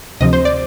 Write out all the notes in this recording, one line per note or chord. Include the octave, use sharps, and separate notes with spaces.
D2 C3 F3 D#5
C5
D5